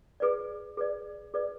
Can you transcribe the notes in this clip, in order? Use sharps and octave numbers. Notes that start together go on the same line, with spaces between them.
G#4 B4 D5
G#4 B4 D5
G#4 B4 D5